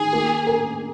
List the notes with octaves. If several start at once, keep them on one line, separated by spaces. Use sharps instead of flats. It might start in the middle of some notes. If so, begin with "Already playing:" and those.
Already playing: D#3 G#4
A#3
A#4